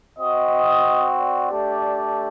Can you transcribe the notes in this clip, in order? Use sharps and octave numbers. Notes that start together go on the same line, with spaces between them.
C4 F#4 D#5
D5
A3 D4 G4